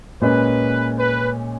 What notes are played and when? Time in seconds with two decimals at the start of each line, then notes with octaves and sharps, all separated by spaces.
0.21 A#2 G#3 C#4 B4
0.98 B4